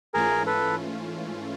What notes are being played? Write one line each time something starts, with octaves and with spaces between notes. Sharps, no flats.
G#2 E3 A3 C#4 F4 G#4 A#4
A4 B4